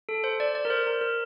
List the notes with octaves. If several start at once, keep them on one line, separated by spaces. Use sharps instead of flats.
A4
C5
D5
D5
A#4
C5
A#4
A#4